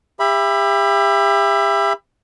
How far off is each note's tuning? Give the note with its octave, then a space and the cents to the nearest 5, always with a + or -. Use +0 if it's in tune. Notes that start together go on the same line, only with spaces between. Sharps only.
G4 +35 E5 +25 B5 +0